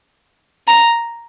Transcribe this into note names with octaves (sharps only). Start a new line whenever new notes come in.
A#5